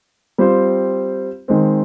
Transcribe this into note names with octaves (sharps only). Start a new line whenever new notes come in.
G3 C4 F4 C5
D#3 G#3 C4